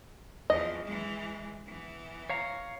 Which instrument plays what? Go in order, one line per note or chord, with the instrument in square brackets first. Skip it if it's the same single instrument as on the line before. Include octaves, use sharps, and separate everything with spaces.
[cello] E2 F3 [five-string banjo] D#5
[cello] E3 G#3
E3 B3
[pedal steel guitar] C#5 F5 A#5